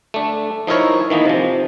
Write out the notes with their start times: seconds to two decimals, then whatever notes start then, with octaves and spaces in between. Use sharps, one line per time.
0.14 A3 D4
0.67 F3 D#4 E4 A#4 C#5
1.10 D#3 E3 A#3 B3 D#4
1.26 C3 F3